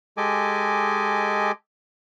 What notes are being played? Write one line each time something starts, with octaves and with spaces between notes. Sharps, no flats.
G#3 G4 A4 D#5 G#5 D6